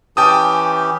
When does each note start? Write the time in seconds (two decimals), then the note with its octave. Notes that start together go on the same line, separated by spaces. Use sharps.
0.17 E3 C#4 G4 G5 A5 D#6